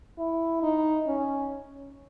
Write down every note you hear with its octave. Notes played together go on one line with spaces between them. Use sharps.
E4
D#4
C#4